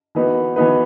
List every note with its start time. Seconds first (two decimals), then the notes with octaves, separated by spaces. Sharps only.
0.15 E3 B3 D#4 F#4 B4
0.56 E3 B3 D#4 F#4 B4